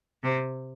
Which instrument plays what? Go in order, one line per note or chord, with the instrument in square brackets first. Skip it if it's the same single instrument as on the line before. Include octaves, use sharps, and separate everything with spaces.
[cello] C3